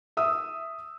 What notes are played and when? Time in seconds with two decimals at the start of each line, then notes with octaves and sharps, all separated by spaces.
0.17 E5 D#6 E6